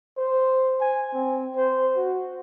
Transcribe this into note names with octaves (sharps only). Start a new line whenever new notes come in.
C5
G#5
C4
C5
F#4